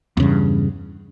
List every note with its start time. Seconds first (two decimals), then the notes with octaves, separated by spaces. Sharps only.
0.17 E2
0.20 C#3
0.22 G2